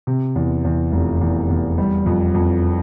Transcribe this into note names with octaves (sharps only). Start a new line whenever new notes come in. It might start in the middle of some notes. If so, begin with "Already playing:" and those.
C3
E2
E2
F1
E2
E2
G3
F2
F2